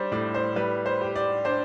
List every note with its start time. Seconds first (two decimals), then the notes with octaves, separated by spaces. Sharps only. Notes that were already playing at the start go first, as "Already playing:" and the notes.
Already playing: G3 D4 C5 D5
0.12 A2 D5
0.34 C5
0.56 G3 B4
0.86 C5
1.01 G4
1.15 D5
1.45 D4 C5